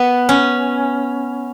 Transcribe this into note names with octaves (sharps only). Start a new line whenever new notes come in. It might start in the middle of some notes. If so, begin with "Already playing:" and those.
Already playing: B3
C#4